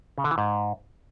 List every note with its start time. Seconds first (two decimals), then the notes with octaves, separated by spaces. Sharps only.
0.18 C#3
0.24 D3
0.31 E3
0.38 G#2